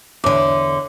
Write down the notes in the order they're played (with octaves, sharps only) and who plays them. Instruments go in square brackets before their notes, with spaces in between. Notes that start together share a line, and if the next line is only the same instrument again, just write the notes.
[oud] E2 D3 [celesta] C#5 D6